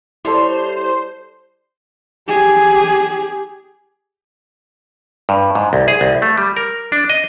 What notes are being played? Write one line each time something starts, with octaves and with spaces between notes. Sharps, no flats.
G3 E4 A4 C5 C#5 C6
G4 G#4
G2
G#2
C2
G#4
C2
A3
G3
A#4
D4
D#5